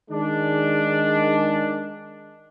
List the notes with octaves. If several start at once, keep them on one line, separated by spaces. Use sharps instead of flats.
D#3 G#3 D4